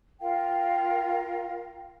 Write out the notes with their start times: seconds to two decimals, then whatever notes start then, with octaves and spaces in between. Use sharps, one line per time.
0.20 F4 A#4 F5 G5